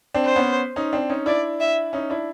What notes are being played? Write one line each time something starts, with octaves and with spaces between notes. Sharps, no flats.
C4 D4
C5
B3 C#4
C#4 D#4
C4 D4
C#4 D#4
D4 E4 D5
E5
C#4 D#4
D4 E4